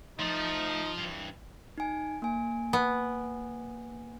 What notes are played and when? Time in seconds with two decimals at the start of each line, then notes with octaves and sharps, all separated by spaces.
0.19 F3 A3 D#4
0.97 G2 E3
1.78 D#4 G#5
2.22 A#3 G#5
2.73 B3